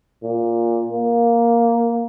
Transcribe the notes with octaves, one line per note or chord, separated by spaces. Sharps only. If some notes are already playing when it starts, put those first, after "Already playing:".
A#2
A#3